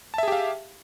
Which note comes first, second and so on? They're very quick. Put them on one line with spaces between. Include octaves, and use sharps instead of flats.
A5 E5 G#4 G4 F5